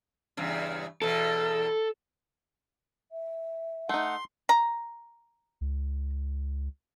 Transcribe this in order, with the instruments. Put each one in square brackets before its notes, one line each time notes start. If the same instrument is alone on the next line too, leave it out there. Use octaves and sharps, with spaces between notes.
[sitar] E2 G2 C#3
[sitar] E2 B2 [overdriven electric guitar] A4
[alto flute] E5
[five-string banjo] A3 D#4 [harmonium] F#5 [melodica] C6
[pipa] A#5
[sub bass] C#2